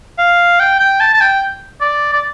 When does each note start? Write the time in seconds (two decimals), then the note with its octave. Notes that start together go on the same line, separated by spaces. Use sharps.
0.18 F5
0.60 G5
0.80 G5
1.00 A5
1.14 A5
1.21 G5
1.81 D5
2.13 D5